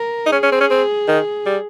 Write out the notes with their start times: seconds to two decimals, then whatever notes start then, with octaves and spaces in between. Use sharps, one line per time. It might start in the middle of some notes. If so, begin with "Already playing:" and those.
Already playing: A#4
0.26 D#4
0.32 C#4 G#4
0.43 C#4
0.52 C4
0.61 C#4
0.71 C4
1.08 D#3
1.46 G3